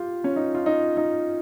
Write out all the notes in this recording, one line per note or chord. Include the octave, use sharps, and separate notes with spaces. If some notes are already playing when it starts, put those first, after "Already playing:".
Already playing: F4 G4
C#4
D#4
F4
D#4
D#4